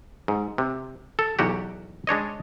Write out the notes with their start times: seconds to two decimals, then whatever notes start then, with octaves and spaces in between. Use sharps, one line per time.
0.28 G#2
0.58 C3
1.19 A4
1.39 B1 E2 F#4 G4
2.07 G#3 D4 C#5 D#5